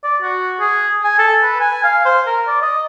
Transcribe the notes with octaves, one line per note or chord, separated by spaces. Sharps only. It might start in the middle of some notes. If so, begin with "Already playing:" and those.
D5
F#4
G#4
G#5
A4
B4
G#5
F5
C5
A#4
D5
D#5